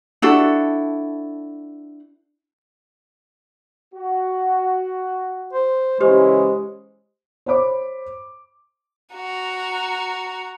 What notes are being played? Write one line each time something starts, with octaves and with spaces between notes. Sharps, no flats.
D4 E4 F#4 A4
F#4
C5
C#3 E3 G#3 C#4 G4 C5
C5 C#5 B5 D6
F#4 A#5